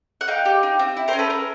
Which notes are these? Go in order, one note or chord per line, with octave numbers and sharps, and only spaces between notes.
F#5
D#4 F5 G5
G4
D#4
C4
E4
A#4 C5
C#4
A4 B4
C#4 A#4